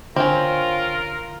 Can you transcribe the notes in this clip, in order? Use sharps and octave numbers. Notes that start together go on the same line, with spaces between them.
D3 C4 C#4 F4 A#4